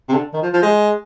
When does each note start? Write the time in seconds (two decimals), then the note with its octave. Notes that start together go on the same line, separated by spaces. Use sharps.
0.09 C3
0.14 D3
0.33 D#3
0.43 F3
0.54 F3
0.63 G#3